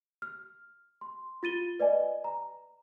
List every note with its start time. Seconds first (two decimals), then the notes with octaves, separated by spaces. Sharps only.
0.22 F6
1.01 C6
1.43 F4 A6 D#7 G7
1.79 B4 D5 D#5 G#5
2.24 A#5